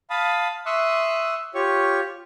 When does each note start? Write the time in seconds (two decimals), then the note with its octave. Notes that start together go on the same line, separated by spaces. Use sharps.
0.10 F5 A5 B5 D#6
0.66 E5 C6 C#6 D#6 E6 F#6
1.54 F4 G4 C#5 C#6